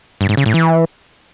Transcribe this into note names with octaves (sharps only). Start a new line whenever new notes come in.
G2
G#2
C#3
A2
E3